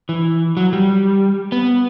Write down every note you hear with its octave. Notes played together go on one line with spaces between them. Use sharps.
E3
F#3
G3
B3